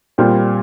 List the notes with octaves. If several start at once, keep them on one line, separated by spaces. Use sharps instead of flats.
A#2 G3 C4 F4